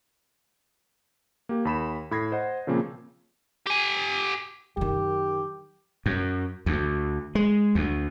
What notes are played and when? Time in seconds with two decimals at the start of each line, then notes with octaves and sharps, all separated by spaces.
1.49 A#3 G4
1.65 D#2 B5 E7
2.11 A2 B5 G#6 A#6 C7
2.32 C5 D#5 F#5
2.67 A#2 C#3 F3 A#3 C4
3.67 G4 G#5
4.77 F#2 D#3 G4
6.06 F#2
6.66 D2
7.35 G#3
7.75 D2